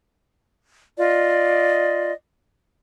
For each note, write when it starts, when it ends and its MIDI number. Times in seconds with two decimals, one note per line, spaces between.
0.97 2.12 65
0.97 2.12 74
0.97 2.12 75